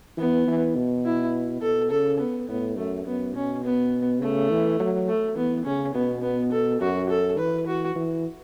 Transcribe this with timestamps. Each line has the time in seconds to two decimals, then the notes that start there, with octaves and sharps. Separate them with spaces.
0.18 E3 B3
0.47 E3
0.76 B2
1.05 E4
1.62 B2 A4
1.91 C#3 A4
2.19 B3
2.48 A2 B3
2.77 F#2 A3
3.06 F#2 B3
3.35 B2 C#4
3.64 B3
4.21 C#3 A3
4.50 E3
4.80 F#3
5.08 A3
5.36 E3 B3
5.65 C#3 C#4
5.95 B2 B3
6.22 B3
6.52 A4
6.81 F#2 F#4
7.10 A4
7.38 E3 B4
7.67 F#4
7.96 E3